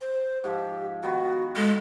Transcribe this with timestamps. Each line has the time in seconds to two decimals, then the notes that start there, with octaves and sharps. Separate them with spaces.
0.01 C5
0.44 G#2 F3 G4
1.03 D#3 B3 F#4
1.56 G#3 A4